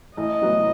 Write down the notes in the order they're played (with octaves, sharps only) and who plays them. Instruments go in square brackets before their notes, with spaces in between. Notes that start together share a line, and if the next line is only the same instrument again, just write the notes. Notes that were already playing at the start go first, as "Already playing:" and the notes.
[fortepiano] A1 [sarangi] D#5
[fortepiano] A2 F#3 B3